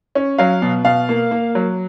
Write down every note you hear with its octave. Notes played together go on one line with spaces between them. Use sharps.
C#4
F#3 F5
B2
B2 F5
A#3
A#3
F#3